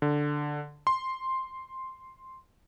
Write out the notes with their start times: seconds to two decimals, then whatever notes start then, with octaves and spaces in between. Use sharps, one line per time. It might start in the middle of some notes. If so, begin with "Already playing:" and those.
0.02 D3
0.87 C6